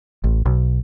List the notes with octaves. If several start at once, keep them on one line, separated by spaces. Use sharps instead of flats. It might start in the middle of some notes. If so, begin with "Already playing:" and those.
A1
B1